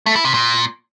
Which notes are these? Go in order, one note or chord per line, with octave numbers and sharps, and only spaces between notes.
A3
E4
C3
A#2